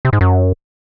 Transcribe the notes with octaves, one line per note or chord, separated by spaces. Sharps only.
C3
G#2
F#2